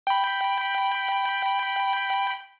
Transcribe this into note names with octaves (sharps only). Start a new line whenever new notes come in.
G5 B5